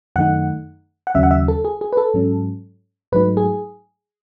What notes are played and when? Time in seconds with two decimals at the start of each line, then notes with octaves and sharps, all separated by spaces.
0.16 F#2 D#3 A3 D#4 F#5
1.07 F#5
1.15 D#2 C#3 F#3 C#4 E5
1.23 F#5
1.31 E5
1.48 A4
1.65 G#4
1.81 G#4
1.93 B4
1.97 A4
2.14 G#2 F#3 C#4
3.12 G#2 F#3 A3 D#4 B4
3.37 G#4